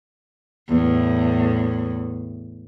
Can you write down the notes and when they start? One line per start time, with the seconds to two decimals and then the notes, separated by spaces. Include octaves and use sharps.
0.68 E2 A2